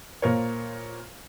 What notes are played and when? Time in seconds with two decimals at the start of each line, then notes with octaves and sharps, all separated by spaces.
0.22 A#2 A#3 A#4 C5 C#5